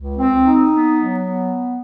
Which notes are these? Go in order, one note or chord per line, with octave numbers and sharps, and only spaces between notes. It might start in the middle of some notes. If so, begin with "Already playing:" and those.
Already playing: C#2
C4
D#4
B3
F#3
B3